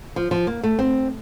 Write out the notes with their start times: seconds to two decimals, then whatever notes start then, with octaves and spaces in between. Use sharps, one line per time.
0.16 F3
0.31 F3
0.47 A#3
0.63 A3
0.79 C4